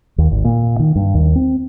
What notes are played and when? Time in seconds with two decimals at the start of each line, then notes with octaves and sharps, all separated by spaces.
0.18 D#2
0.31 G#1
0.45 A#2
0.79 D#3
0.96 G2
1.15 D#2
1.36 C4